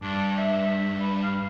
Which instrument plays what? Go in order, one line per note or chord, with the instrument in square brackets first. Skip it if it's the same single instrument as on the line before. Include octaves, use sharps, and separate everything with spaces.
[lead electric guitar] G2 [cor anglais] D4
[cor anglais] E5
B4
F5